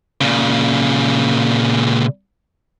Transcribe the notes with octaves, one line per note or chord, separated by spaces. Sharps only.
A#2 C#3